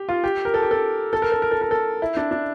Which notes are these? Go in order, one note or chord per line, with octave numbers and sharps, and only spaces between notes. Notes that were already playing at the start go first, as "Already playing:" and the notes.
Already playing: G4
F4
G4
A#4
A4
G4
A4
A4
A#4
A4
A#4
A4
A#4
A4
E4
D4
D4